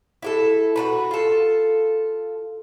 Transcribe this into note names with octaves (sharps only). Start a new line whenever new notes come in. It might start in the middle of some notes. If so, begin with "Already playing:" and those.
E4 G4 A4
F#4 A4 B4
F4 A4